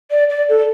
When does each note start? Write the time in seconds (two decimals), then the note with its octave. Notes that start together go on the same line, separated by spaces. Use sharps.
0.10 D5
0.29 D5
0.48 A4